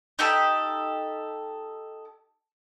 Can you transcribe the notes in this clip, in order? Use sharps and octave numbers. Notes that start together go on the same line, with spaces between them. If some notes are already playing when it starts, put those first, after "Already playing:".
D#4 G4 A4